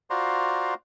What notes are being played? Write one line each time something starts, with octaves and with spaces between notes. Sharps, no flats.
F4 F#4 C5 D5 A#5 C6